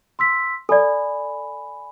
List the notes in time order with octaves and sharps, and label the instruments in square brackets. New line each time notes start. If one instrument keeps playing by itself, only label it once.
[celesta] C6 E6 B6
[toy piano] A4 D5 [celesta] G#5 B5